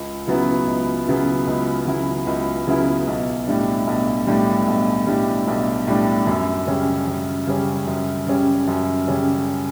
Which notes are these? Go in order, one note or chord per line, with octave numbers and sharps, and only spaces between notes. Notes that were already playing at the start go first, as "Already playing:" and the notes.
Already playing: C#2
C#3 F#3 B3 E4
C#2
C#3 F#3 B3 E4
C#2
C#3 F#3 B3 E4
C#2
C#3 F#3 B3 E4
B1
A2 G3 D4
B1
A2 G3 D4
B1
A2 G3 D4
B1
A2 G3 D4
F#2
C#3 G3 C#4
F#2
C#3 G3 C#4
F#2
C#3 G3 C#4
F#2
C#3 G3 C#4